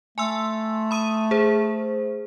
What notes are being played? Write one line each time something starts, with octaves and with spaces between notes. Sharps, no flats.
A3 G#5 C6 E6
B5 D#6 D#7
G#4 C5